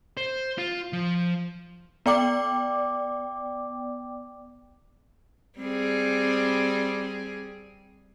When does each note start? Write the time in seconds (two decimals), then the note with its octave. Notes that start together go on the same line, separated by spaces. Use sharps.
0.17 C5
0.58 F4
0.93 F3
2.06 B3 D5 G5 D6
5.59 G3 C4 G#4